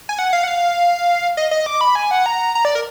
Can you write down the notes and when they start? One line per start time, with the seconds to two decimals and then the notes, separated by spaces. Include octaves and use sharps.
0.09 G#5
0.19 F#5
0.33 F5
0.44 F#5
0.48 F5
1.37 D#5
1.51 D#5
1.66 D6
1.81 B5
1.95 G#5
2.11 F#5
2.26 A#5
2.55 A#5
2.65 D5
2.75 A#4